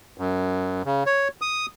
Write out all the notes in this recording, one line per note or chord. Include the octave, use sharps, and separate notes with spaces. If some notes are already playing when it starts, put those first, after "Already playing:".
F#2
C#3
C#5
D#6